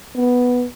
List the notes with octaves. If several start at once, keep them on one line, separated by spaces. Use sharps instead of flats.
B3